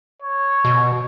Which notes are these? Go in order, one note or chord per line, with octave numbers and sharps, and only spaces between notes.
C#5
B2